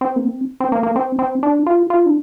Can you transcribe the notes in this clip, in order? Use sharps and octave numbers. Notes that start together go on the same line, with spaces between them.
C4
A#3
C4
C4
A#3
A#3
C4
C4
D4
F4
F4
D4